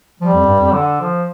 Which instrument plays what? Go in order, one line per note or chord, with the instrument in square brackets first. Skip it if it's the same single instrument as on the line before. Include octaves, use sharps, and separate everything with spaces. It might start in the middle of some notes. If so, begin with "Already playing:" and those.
[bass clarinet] F3 [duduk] G3
[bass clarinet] F2
G2
F2
[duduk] D3
F3